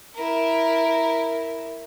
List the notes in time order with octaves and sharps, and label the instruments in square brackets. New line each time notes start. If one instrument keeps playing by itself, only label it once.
[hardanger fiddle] E4 A#4